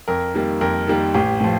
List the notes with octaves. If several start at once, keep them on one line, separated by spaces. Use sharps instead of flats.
F2 A#4
D#3 G3 A#3
F2 A#4
D#3 G3 A#3
A1 G4
A2 F3